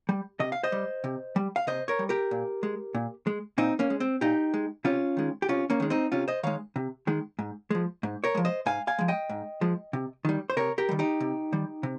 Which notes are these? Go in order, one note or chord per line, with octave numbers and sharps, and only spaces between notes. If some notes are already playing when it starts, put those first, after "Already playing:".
G3
C3 D#5
F5
C5 D#5
G3
C3
G3
F5
C3 C5 D#5
A#4 C#5
G3
G4 A#4
A#2
G#3
A#2
G#3
A#2 C4 D#4
A#3 C#4
G#3
C4
A#2 D#4 G4
G#3
C3 C#4 F4
D#3 G#3
G4
C3 C#4 F4
A#3 C#4
D#3 G#3
C4 D#4
C3 C#4 F4
C5 D#5
D#3 G#3 C#5 F5
C3
D#3 G#3
G#2
F3 G#3
G#2
A#4 C#5
F3 G#3
C5 D#5
G#2 F5 G#5
F5 G#5
F3 G#3
D#5 G5
G#2
F3 G#3
C3
D#3 G3
C5
C3 A#4 C#5
G4 A#4
D#3 G3
D#4 G4
C3
D#3 G3
C3